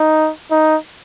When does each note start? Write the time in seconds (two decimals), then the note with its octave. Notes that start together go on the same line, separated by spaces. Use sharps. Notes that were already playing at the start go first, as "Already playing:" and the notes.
Already playing: D#4
0.51 D#4